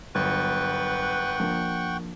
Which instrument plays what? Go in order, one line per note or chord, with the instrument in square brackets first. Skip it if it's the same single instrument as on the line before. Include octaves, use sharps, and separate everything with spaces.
[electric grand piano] G1 [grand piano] F#3 [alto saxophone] B4 [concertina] F#5 G5 C#6
[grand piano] F3 A#3 D4